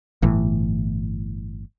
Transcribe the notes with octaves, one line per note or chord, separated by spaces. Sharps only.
G1 A2 E3